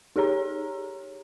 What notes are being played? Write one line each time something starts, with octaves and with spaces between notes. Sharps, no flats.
D#4 G4 G#4 C#5 A#5